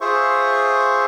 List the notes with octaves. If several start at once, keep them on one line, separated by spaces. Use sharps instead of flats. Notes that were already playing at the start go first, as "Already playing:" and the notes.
F4 G#4 C5 E5 C#6